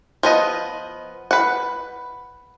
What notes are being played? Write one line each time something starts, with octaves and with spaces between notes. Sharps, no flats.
F3 B3 D#5
B4 F#5